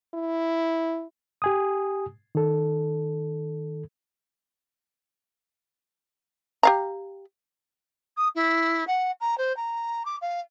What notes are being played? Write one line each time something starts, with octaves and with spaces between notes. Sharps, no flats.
E4
G4 G#5 D#6
D#3 A4
G4 F5 A#5
D#6
E4
F#5
A#5
C5
A#5
D6
F5